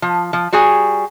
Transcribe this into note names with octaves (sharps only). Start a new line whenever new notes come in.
F3
F3
G3 F#4 G#4 G#5